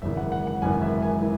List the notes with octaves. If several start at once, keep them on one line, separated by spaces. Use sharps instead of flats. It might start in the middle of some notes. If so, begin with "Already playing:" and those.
G#1 F#2 C#3 E3 E5
F#5
F#5
F#5
G#1 F#2 C#3 E3 G#5
E5
G#5
E3